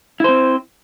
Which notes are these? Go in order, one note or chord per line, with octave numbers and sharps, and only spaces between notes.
C4 E4 C5